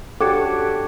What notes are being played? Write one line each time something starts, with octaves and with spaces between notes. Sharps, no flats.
D4 F#4 G4 A4 C#5 D6 G#6 C#7